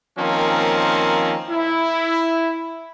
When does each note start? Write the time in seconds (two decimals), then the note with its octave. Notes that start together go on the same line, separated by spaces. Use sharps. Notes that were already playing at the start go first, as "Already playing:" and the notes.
0.19 D#3 F3 A#3 C4 C#4
1.50 E4